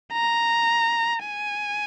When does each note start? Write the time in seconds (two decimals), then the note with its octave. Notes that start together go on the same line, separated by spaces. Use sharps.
0.13 A#5
1.25 G#5